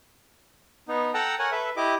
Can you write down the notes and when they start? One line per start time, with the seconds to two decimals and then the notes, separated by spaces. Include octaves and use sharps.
0.88 B3 D#4
1.14 A4 F#5 G5 A5 A#5
1.39 A#4 C#5 F#5 G#5
1.52 A4 B4 E5
1.77 E4 G4 D#5 D6